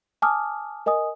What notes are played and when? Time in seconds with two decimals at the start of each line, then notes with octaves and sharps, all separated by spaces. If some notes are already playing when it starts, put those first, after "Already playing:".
0.22 G#5 A5 D6 D#6 F6
0.86 A#4 D#5 G#5 D#6